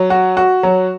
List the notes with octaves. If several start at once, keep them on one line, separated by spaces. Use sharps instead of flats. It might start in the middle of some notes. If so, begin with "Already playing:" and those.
Already playing: F#3
F#4
F#4
F#3